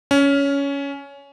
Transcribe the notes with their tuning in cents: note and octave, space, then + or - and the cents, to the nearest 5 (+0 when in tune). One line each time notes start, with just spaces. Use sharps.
C#4 +15